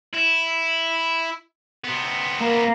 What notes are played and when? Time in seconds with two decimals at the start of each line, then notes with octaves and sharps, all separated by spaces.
0.13 E4
1.84 C3 B3
2.40 A#3